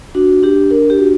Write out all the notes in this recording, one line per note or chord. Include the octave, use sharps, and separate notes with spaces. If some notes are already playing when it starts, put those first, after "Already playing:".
D4 F#4
D4 G4
D4 A#4
G4
F#4